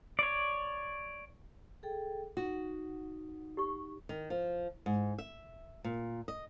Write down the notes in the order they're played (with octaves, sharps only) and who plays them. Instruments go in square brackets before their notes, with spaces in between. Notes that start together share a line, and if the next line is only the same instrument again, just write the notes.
[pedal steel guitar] C#5 D5
[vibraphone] G#4 A4 G5
[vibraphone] D#4 [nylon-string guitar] F#4
[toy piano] G4 C#6
[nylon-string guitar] D#3
F3
G#2
E5
A#2
D#5